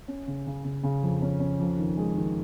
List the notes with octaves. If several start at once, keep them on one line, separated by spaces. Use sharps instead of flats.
C#4
C#3
C#3
C#3
C#3
F2
C#4
C#4
F2
D#3
G#3
D#3